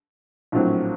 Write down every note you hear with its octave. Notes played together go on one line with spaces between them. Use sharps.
A#1 A2 F#3 C4